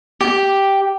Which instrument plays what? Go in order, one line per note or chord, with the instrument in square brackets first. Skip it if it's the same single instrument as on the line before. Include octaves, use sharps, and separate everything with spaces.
[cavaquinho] G4